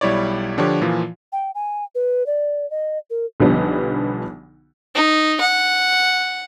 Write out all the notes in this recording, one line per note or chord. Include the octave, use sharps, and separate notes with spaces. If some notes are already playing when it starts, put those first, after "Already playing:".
B1 G3 E4 C#5 D5
D3 F3 D4 G4 C#5
A#2 E3 F3 F4
G5
G#5
B4
D5
D#5
A#4
B1 D3 F3 G3 B3
D#4
F#5